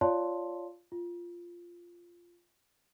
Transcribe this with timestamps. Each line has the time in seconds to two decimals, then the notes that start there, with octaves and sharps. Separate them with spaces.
0.01 F4 C#5 D5 F5 A5 C6
0.92 F4